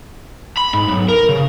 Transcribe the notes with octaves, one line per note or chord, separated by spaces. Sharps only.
B5
G#2
B1
A#4
C#3